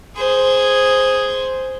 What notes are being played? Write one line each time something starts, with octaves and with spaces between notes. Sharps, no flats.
G#4 C5